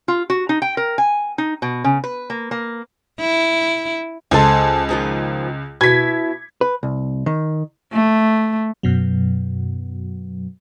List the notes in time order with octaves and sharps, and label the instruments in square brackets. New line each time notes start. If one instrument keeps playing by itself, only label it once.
[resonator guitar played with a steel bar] F4
F#4
D#4
G5
A#4
G#5
D#4
B2
C#3
B4
A#3
A#3
[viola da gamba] E4
[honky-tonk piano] C#2 [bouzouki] A4 C5 G#5
[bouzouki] D#3 F3 G#4
[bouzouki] B2 E4 [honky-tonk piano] G#6 B6
[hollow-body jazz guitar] B4
C2
D#3
[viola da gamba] A3
[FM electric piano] F#2 B2 F#3